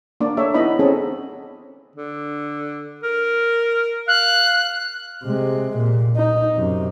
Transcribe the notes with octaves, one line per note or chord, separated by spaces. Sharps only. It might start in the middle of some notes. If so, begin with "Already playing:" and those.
A#3 D4 D5
A4 C#5 E5
B3 D#4 E4 D#5 B5
C4 C#4 G#4 A4
D3
A#4
F5 F#6
C3 G#3
A#2
D#4
F#2 C3